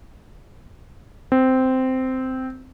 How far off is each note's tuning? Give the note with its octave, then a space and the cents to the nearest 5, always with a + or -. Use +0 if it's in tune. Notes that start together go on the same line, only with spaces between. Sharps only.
C4 -10